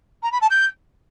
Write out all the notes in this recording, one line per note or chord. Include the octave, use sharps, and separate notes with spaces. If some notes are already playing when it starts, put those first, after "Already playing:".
A#5
B5
A5
G6